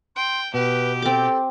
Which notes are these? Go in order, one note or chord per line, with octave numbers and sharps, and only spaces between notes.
G5 C6
B2 G4 B4
C4 A4 D6